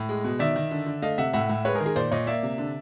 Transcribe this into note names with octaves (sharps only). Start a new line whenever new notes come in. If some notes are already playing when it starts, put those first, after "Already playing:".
Already playing: A2
G#3
B2
D#3 D5 E5
D#3
D3
D3
A3 D#5 F5
C3 E5 F#5
A2 E5 F#5
A2
G#3 B4 C#5
G#4 A#4
D#3
G#4 A#4
A#2 C5 D5
A#2 C#5 D#5
A#3 D5 E5
C3
D3